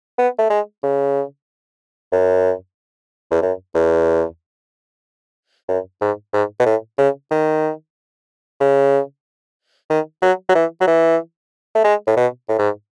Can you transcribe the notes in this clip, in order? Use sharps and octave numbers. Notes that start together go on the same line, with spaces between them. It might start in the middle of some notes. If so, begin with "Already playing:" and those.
B3
A3
G#3
C#3
F#2
E2
F#2
E2
F#2
G#2
G#2
B2
A2
C#3
D#3
C#3
D#3
F#3
F#3
E3
F#3
E3
A3
G#3
A2
B2
A2
G#2